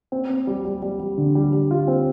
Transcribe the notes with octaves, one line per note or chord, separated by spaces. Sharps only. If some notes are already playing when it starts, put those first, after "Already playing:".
C4
C4
G3
G3
G3
G3
D3
G3
G3
F4
C4